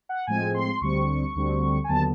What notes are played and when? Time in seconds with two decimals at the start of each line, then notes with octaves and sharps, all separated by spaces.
0.09 F#5
0.27 A2 F3 G#3 C4 G#5
0.54 C6
0.81 D2 D3 G3 C4 C#6
1.35 D2 D3 G3 C4
1.84 G#5
1.89 D#2 D3 F#3 B3 A5